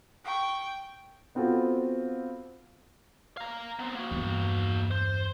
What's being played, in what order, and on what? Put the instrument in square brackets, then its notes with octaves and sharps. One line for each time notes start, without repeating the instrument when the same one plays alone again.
[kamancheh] G5 C#6
[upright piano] B3 C4 F4 F#4 A4
[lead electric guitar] F5 A#5
B3 C4
A#3 F#4
[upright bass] E2 G2
[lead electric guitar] C5